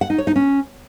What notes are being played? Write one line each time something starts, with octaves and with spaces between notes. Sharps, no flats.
F#5
D#4
C#5
D#4
C#4